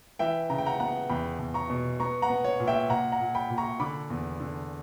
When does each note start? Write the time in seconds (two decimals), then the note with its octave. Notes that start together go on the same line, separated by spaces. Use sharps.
0.19 E3 E5 G5
0.50 C#3 A#5
0.58 G5
0.66 F#5 A#5
0.80 B3 F#5 A#5
1.09 E2 G5 B5
1.39 E2
1.54 A#5 C#6
1.70 B2
2.00 B3 A#5 C#6
2.22 F#5 A#5
2.30 B3
2.45 C#5
2.60 A#2
2.68 E5 G5
2.89 A#2 F#5 A#5
3.12 F#5 A#5
3.20 A#2
3.35 G5 B5
3.50 A#2
3.58 A#5 C#6
3.80 D3 B5 D6
4.10 E2
4.40 D3